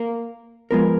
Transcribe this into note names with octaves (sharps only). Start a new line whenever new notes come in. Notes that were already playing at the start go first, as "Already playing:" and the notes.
Already playing: A#3
F3 G#3 B3 F4 A#4